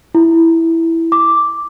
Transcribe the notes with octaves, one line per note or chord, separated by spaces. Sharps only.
E4
D6